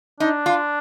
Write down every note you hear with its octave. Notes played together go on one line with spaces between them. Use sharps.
D4 D#4
F4